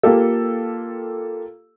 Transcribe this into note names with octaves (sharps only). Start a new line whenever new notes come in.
A#3 F4 G4 A4